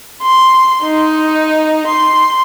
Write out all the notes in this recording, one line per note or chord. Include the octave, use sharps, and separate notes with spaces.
C6
D#4
C6